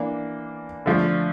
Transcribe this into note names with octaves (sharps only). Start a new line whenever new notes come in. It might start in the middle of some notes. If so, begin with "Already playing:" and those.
Already playing: E3 A#3 D4
D3 F3 A3 D4